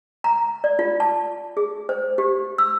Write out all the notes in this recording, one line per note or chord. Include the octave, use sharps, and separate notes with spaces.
A#5
D5
F4
A5
G#4
C5
G4
E6